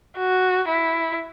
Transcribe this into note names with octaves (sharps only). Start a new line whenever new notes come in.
F#4
E4